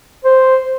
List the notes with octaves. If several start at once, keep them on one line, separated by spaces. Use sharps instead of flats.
C5